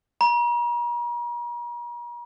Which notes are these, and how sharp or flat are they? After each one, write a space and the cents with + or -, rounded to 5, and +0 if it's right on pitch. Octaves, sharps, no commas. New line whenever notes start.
A#5 +45